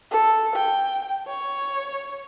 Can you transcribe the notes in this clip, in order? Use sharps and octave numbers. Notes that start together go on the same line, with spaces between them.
A4
G5
C#5